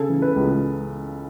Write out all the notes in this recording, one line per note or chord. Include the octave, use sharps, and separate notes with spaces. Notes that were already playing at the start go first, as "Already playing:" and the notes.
Already playing: C#3 A4
E3
B4
C#2